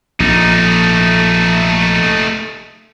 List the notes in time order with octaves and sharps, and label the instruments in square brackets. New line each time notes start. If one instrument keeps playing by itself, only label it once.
[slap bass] A#1 [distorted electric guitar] A3 D#4